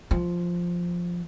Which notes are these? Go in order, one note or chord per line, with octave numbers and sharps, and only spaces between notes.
F3